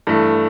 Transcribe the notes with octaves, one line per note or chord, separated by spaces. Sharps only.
G2 E3 A3